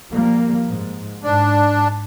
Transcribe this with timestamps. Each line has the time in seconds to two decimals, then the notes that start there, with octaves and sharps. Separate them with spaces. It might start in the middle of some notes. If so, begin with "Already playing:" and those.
0.11 F3 G3 A#3
0.67 G#2
1.23 G#2 D4